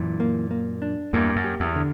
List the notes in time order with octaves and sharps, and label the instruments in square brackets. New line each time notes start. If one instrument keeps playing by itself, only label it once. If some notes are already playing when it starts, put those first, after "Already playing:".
Already playing: [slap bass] F#2 A#2 [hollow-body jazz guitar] E3
[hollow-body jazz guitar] A#3
A#3
D4
[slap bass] E2 G2 [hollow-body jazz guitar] A#3
[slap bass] F#2
[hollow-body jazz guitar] G4
[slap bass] E2
[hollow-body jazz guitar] D3